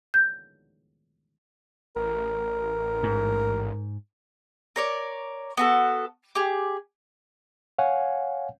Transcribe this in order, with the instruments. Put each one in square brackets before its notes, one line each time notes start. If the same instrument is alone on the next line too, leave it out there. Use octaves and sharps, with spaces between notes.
[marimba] G6
[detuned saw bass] A1 [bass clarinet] A#4
[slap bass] G#2
[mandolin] A#4 C#5 D5
B3 F#4 A4
G4 G#4
[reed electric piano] C#5 F5 F#5 G#5